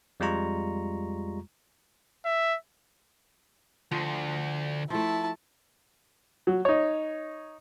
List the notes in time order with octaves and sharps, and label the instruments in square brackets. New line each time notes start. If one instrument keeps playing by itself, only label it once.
[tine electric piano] F2 G3 G#3 F4 A#5 C#6
[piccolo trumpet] E5
[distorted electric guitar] D2 [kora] F3
[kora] F3 A3 [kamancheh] E4 A5
[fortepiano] F#3
D#4 C#5